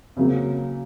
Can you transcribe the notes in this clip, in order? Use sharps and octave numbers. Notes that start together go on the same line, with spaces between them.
C#3 F#3 A#3 C4